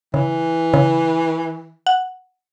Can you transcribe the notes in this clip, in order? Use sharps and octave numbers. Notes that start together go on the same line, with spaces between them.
C#3 E3
C#3
F#5